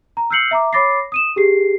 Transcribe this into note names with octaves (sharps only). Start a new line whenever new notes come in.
A#5
E6 F6 G6 C7 C#7 F#7
E5 A#5 D6
C#5 B5 D6 A6 A#6 C7
D#6 D#7 E7
G4 G#4 C7